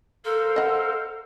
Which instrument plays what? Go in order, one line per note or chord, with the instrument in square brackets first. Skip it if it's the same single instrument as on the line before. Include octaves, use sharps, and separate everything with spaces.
[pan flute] A4 [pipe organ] A#4 C5 F5
[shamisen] D#5 F#5